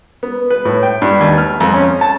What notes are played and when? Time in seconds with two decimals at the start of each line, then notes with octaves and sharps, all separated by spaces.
0.23 B3
0.50 B4
0.65 A2
0.83 G5
1.02 G2
1.21 D#2
1.38 F6
1.60 F2
1.74 C#4
2.01 A5